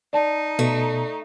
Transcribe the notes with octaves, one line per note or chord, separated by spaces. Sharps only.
D#4 D5 A5
B2 A3